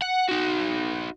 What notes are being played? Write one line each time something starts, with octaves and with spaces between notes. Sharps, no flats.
F#5
D#4 F#4